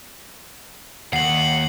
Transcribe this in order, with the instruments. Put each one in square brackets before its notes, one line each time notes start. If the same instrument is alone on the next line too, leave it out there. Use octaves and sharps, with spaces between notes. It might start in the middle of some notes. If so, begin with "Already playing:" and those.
[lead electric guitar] D#2 [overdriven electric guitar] F#5 [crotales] C7 F#7